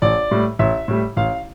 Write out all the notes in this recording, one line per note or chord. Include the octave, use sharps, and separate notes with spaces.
A1 D5
A2 G3
A1 E5
A2 G3
A1 F5